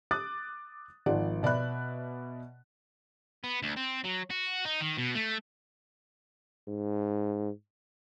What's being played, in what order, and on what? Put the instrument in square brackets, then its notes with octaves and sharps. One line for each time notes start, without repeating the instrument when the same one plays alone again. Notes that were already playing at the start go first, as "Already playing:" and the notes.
[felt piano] D6 D#6 F#6 A6
G#1 F3 D5 F#5
B2 D5 E5 B5 F#6
[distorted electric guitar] B3
D2
C4
F#3
F#4
D#4
D#3
B2
A3
[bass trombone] G#2